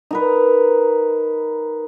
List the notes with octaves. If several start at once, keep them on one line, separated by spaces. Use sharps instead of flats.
D#4 A#4 B4